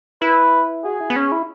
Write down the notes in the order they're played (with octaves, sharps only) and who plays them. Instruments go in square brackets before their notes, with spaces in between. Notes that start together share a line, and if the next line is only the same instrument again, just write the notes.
[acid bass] E4 [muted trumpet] B4
[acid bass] F#4 [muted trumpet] G#4
[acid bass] E4
B3
C#4
E4